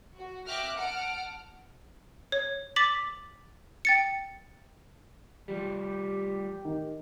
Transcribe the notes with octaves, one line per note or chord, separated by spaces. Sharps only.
F#4
E5 G5 D6 F6 F#6 A#6
F#5 A5 F6 D7
C#5
D6 A6 B6 F#7
G5 A6 C#7
F3 G3 G4
D#3